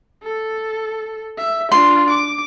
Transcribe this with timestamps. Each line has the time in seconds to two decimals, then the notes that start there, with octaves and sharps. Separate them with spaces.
0.23 A4
1.38 E5
1.72 D4 F4 C6
2.10 D6